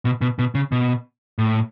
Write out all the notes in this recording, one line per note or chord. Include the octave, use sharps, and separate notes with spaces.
B2
B2
B2
C#3
B2
A2